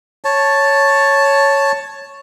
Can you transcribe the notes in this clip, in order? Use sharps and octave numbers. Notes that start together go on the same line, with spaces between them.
C#5 A5